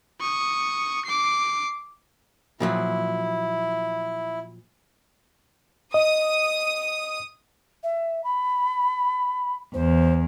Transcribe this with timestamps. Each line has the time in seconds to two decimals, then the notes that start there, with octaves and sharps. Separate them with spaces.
0.21 C#6 D#6
1.05 D6 C7
2.60 A#2 F3 F#3 E4
5.94 D#5 D#6
7.83 E5
8.24 B5
9.74 E2 C5